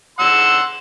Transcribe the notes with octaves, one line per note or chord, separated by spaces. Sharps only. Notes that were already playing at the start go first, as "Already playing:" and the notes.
F#5 C6 E6